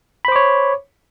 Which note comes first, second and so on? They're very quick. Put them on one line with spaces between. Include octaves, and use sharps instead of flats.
B5 C5 D6 C#5